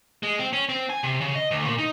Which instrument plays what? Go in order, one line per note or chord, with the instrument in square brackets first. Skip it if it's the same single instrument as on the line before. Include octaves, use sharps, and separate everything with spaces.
[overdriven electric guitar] G#3
C4
C#4
C4
G#5
C3
C#3
D#5
D2
A#2
D#4